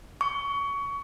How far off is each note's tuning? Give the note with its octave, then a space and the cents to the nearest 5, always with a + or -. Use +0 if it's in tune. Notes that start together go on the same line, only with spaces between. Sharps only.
C#6 +20